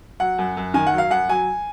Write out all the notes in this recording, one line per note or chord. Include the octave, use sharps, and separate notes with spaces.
F#3 F#5
F#2
F#2
D#3 G#5
F#5
F#3
F5
F#2 F#5
F#3 G#5